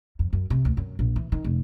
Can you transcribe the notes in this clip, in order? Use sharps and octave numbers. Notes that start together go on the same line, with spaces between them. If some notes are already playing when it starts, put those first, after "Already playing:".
F2
F#2
C3
D2
F#2
A#1
E3
D#3
F1